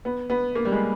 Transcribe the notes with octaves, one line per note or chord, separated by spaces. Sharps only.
B3
B3
A#3
G3
G#3